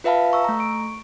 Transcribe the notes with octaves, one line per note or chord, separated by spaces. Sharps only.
F4 B4 E5 F5 A5 B5
A#5 C#6 E6
A3 A#5
C#6 D7